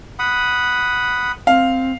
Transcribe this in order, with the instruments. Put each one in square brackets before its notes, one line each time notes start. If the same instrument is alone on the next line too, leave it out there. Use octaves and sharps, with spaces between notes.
[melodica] F#5 B5 D#6
[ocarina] C4 [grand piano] F5